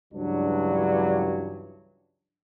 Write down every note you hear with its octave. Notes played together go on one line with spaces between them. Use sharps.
C#2 G2 E3 F#3 D4